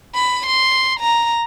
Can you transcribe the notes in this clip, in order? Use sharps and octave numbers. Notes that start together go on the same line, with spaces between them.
B5
C6
A#5